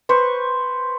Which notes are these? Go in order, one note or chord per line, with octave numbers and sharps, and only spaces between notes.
B4 C5 C#6